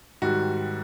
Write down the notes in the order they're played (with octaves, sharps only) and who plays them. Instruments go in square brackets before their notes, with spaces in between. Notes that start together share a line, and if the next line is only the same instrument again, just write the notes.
[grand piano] G#2 D#3 G3 F#4